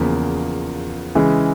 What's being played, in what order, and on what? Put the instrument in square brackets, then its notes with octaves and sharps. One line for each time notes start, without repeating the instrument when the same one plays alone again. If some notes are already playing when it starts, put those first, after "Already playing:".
Already playing: [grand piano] E2 C#3 F3 A#3
C#3 E3 G#3